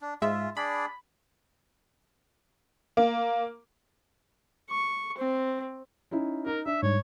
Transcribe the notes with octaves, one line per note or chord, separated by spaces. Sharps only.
D4
G#2 G#3 F4 E5
D4 G#4 D5 B5
A#3
C#6
C4
C#4 D#4 E4
D#4 A#4
D4 E5
G#2 G3 C#5